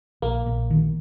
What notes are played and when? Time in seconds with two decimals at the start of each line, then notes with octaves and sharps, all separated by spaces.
0.22 A#1 A#3
0.46 A#1
0.70 D#3